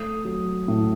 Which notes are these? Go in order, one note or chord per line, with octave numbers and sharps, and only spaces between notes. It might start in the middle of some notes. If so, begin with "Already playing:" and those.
Already playing: A3 D#6
F#3
A2